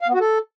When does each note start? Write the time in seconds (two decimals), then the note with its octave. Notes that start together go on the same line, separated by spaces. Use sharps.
0.01 F5
0.08 B3
0.14 F#4
0.20 A4